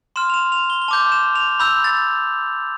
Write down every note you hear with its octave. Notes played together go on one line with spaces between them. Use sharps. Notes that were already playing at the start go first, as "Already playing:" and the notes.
C6 F6 E7
F7
E7
F7
G7
G7
A5 D6 G6 F7
E7
F7
B5 E6 G6 F7
A6